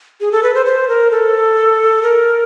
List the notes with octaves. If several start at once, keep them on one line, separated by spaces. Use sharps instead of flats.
G#4
A4
B4
C5
C5
A#4
A4
A#4